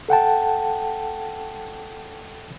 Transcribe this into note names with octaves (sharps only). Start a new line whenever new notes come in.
A4 F#5 G5 A5